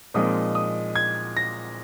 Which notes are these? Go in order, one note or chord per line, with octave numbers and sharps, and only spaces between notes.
A#2 F3 G#3 C4 D#4 D#6
D#6
G#6
A#6